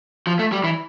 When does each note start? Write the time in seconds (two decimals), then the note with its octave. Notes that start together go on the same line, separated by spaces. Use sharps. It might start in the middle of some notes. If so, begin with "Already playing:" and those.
0.27 F3
0.39 A3
0.52 G3
0.64 E3